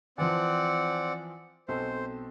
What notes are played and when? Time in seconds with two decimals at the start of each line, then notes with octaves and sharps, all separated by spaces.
0.18 E3 F3 C4 D5 F#5
1.68 B1 C4 A4 C5